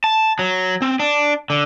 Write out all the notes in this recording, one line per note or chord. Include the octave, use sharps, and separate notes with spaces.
A5
F#3
C4
D4
D3